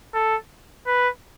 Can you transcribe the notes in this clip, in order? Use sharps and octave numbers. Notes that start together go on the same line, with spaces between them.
A4
B4